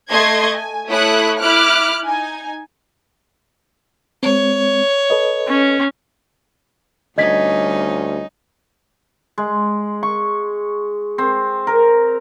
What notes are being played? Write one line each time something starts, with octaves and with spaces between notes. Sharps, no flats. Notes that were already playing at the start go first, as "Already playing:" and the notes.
A3 D#5 C6 G#6
G#5
A3 E4 C#5 E5 D#6 F#6
E4 D6 F6 F#6
D#4 G#5
G#3 C4 C#5
A4 B4 D#5
C#4
D2 G3 C#4 D#4 D#5 G#6 B6
G#3
C#6
C4
A#4